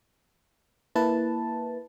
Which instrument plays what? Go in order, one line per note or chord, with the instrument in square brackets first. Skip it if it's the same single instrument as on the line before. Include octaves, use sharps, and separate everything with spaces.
[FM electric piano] A#3 E4 B4 A5